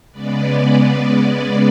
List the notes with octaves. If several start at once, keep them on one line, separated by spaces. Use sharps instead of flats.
C#3 G#3 B3 B4 D5